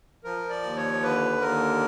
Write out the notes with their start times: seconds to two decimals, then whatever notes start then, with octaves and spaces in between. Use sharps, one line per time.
0.24 F3 A#4
0.50 D5
0.63 D#2
0.76 C#5
1.02 D3 B4
1.41 D#2 A#4